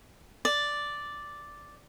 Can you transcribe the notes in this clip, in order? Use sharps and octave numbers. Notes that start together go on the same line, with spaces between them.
D5